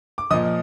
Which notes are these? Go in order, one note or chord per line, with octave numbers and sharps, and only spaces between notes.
D6
A#2 F3 D#5 D#6